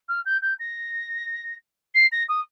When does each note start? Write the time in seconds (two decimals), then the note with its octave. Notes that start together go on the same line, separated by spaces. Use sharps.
0.08 F6
0.26 G6
0.42 G6
0.59 A#6
1.94 C7
2.12 A#6
2.29 D#6